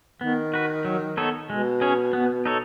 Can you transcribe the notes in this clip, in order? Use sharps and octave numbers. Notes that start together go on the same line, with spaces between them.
D#3 B3
F#4 B4
F#3
B3 D#4 A4 C#5
B2 G#3
C#4 G#4 C#5
B3
D#4 A4 C#5